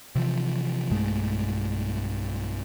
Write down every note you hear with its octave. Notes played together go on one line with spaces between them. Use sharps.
C3 E3 F3
B1 G2 G#3 A3